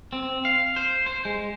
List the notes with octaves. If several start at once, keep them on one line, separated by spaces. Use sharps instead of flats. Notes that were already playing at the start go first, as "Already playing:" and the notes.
C4
F5
C5
C5
G#3